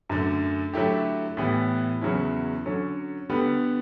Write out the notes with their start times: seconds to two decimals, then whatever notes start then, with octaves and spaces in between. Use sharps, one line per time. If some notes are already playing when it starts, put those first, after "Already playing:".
0.09 F#2 D3 A3
0.73 D3 F#3 A3 E4 G4
1.37 A2 E3 G3 B3
2.01 E2 C#3 F#3 C#4 E4
2.66 D3 F#3 C#4
3.29 D3 G3 B3